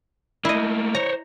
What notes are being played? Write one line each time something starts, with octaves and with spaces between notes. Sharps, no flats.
A3 A#3 E4 D#5
C5 C#5 A#5